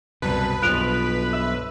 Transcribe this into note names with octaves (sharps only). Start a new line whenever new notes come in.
C2 F#2 B2 B4 A5
B1 G2 F3 F#6 D7 F7
E5